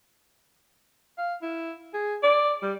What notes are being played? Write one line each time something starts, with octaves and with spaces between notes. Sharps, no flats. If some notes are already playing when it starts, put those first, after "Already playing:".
F5
E4
G#4
D5
G3